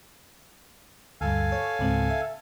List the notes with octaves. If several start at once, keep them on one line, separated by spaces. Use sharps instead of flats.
D2 G2 A4 F5 G#5
C#5
C#2 G#2 C4
E5